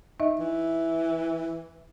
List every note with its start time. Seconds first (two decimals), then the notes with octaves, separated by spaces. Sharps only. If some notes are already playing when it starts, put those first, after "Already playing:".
0.20 D#4 D#5 E5
0.39 E3